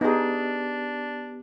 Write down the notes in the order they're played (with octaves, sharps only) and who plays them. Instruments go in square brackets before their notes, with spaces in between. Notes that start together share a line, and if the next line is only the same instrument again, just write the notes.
[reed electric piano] B3 G4 [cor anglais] D4 [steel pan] D#4 G#4